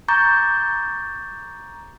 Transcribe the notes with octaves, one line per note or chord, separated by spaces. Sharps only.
A#5 C#6 D6 G6 A6